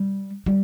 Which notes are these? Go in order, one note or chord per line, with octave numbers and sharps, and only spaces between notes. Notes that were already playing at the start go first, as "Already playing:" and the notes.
Already playing: G3
G3